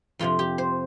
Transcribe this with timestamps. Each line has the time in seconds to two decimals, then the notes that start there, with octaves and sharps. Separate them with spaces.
0.19 F2 C3 F3 F4
0.39 G4
0.58 C5